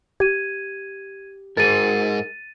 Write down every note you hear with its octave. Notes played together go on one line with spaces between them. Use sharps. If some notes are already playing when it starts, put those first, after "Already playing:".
G4 G#6 D#7
G#2 G#4 A#4 A6 D#7